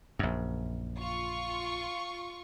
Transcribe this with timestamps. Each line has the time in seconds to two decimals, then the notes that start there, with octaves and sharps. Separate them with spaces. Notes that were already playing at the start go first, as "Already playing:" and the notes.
0.19 A#1 F#2
1.00 F4 C#6